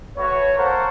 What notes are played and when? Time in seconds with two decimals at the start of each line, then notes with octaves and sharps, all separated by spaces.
0.17 A3 F#4 B4 C#5
0.57 A#3 A4 A#4 C5 F#5 C#6